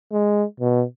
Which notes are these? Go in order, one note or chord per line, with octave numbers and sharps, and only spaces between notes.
G#3
B2